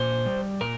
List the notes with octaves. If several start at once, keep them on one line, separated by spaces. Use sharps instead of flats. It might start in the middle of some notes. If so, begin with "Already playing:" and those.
Already playing: A#2 C5
G3
A#2 A#4